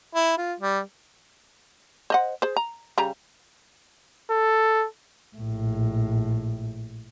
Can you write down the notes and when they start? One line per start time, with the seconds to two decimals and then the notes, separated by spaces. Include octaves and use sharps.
0.15 E4
0.38 F4
0.60 G3
2.10 C5 D#5 F#5
2.42 G#4 C5
2.57 A#5
2.98 C#3 G3 A#5
4.31 A4
5.36 A#1 A2